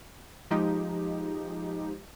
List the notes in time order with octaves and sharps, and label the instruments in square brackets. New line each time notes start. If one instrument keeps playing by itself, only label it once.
[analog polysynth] F3 G#3 D#4 G4